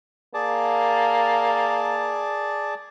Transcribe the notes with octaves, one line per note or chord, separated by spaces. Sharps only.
A#3 G#4 D5 A5